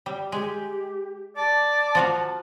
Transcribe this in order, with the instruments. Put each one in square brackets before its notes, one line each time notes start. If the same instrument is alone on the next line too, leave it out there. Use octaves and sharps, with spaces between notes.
[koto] G3
[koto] G#3 [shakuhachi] G4
[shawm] D5 [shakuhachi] A5
[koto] F3 F#4 F5